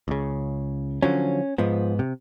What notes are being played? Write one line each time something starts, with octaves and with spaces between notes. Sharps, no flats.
C#2 C#3
D3 F3 F#3 C#4
G#2 F3 B3
C3